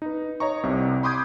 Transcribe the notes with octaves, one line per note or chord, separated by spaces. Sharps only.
D#4 B4
C#5 D#5 A#5 C#6
C2 C3
B5 C6 D6 D#6 G6 G#6